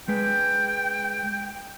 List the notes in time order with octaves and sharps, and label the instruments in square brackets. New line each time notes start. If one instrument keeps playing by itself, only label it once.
[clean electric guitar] G#3 B4 [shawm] G5